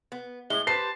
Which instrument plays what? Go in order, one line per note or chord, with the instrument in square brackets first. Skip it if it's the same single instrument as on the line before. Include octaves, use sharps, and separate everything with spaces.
[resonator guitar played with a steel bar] B3
[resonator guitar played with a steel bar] A2 G#3 E4 [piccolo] G7
[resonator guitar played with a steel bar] G4 B4 C5 [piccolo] A5 [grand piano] C7